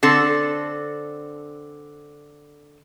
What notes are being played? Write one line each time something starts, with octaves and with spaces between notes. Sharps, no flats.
D3 C4 A4